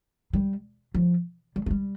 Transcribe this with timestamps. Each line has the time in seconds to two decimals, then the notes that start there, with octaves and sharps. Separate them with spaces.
0.33 G3
0.94 F3
1.56 G3
1.66 A3
1.71 G3